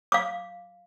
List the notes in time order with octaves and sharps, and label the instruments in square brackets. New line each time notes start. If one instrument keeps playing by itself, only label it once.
[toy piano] F5 D6